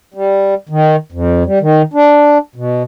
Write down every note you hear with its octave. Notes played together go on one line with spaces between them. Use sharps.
G3
D#3
F2
G3
D#3
D4
B2